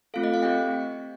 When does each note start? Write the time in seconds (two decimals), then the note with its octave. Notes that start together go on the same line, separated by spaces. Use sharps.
0.14 A3 C4 F4 A4 F5
0.24 D#5
0.34 F5
0.43 C4 G4 G5